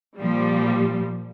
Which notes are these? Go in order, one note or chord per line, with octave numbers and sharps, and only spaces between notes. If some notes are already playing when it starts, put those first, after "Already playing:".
A#2 F3 G3